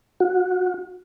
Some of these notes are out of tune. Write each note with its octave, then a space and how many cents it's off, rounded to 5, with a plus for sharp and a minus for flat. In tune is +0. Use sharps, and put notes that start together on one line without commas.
F#4 -25